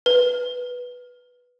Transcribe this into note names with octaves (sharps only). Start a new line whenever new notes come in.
B4